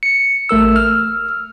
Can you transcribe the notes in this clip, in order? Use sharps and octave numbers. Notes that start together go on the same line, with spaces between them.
C#7
A1 A3 A#4 E6
E6 F6